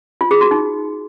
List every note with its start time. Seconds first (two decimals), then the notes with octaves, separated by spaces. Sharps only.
0.21 F4
0.31 G#4
0.41 F#4
0.51 D#4